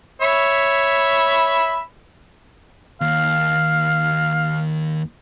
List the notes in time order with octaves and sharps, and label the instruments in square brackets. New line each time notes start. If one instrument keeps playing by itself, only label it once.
[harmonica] C#5 E5 B5
[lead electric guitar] D#2 [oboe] F5